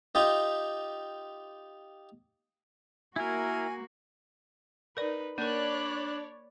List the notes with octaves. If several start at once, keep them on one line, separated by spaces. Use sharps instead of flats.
D#4 F4 G4 D#5
A#3 E4 F#4 A#4 G#5
D#4 A#4 B4 D5
A#3 D4 A#4 C#5 D5 B5 F#6